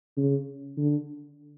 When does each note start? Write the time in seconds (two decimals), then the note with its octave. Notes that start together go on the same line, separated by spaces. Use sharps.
0.17 C#3
0.77 D3